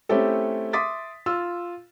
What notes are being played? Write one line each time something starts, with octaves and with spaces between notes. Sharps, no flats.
A3 C4 C#4 E4 G4 A4
E5 C6 D6 D#6 A6 B6
F4 E6